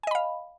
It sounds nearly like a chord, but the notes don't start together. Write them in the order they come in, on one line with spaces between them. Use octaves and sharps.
G#5 D#5 B5 F5